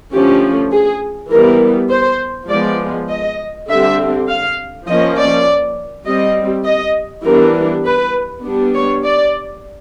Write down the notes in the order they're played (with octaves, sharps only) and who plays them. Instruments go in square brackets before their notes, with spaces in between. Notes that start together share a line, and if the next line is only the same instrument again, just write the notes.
[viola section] D3 F3 A3 C#4 G4
G#4
E3 G3 B3 A#4
C5
F3 G#3 B3 D5
D#5
D3 G3 C4 E5
F5
F3 A#3 C#4 D#5
D5
G3 C4 D#5
D#5
E3 G3 B3 D4 A#4
B4
G3 B3 D4
C#5
D5